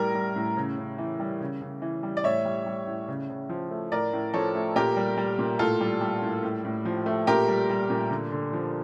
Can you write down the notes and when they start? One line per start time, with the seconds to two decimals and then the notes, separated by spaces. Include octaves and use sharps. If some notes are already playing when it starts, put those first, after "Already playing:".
Already playing: A2 G3 A#4
0.15 G3
0.36 A2
0.57 C#3
0.78 C#3
0.98 E3
1.20 G3
1.41 C#3
1.62 C#3
1.82 E3
2.03 G3
2.17 D5
2.24 A2 C#5 E5
2.45 G3
2.66 G3
2.87 A2
3.08 C#3
3.30 C#3
3.49 F3
3.71 A3
3.92 A2 A#4 D5
4.13 A2
4.34 F3 A4 C#5
4.55 A3
4.76 A#2 G4 A#4
4.97 G3
5.17 G3
5.39 A#2
5.59 A2 F4 A4
5.81 G3
6.01 G3
6.22 A2
6.43 A2
6.65 A2
6.85 F3
7.06 A3
7.27 A#2 G4 A#4
7.48 G3
7.70 G3
7.90 A#2
8.11 D3
8.32 D3
8.53 F3